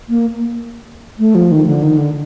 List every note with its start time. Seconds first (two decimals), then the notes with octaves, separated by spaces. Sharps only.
0.09 A#3
1.19 A3
1.35 F3
1.52 D#3
1.66 D3
1.83 D#3
1.98 D3